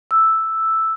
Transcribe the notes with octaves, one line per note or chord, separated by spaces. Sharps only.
E6